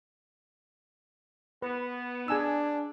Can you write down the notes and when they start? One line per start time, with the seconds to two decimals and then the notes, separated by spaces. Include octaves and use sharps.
1.62 B3 B4
2.28 D4 G#4 G#5 E6